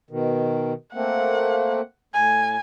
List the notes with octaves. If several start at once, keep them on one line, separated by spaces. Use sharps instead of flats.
B2 D#3
A3 A#3 C4 F#5
A2 G#5